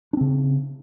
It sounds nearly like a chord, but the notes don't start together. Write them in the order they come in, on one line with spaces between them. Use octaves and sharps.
D4 C4 C#3